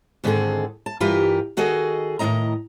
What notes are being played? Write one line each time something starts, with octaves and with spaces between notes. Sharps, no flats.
G#2 D3 D#3 C4 G#4 A4
A5
G2 E3 F4 G4 A#4 B4
D#3 F#4 G#4 A4 D#5
A2 D#3 E3 C4 D#5 A#5